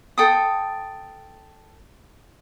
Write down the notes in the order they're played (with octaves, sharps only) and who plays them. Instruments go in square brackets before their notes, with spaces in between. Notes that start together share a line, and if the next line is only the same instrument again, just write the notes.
[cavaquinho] A4 G5 D#6